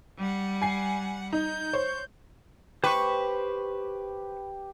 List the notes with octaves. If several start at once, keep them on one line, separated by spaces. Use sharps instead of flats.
G3 F#5
G#5 C7
D#4 G6
C5 C#5
G4 B4 C5 C#6